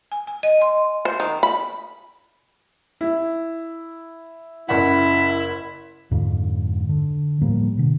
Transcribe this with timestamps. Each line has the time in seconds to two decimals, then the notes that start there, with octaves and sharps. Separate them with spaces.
0.12 G#5
0.27 G#5
0.43 D#5
0.62 C6
1.05 C5
1.20 D#3
1.43 B5
3.01 E4
4.69 F#1 E4 F#5
6.11 F2 G#2 D3
6.89 D3
7.42 A2 F3 G3 A#3
7.77 B2 D3